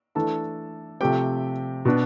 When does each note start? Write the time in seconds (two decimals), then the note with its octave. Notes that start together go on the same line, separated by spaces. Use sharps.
0.15 E3 A3 D4 A4 A5
1.00 C3 F3 A3 C4 G4 G5
1.85 B2 B3 D4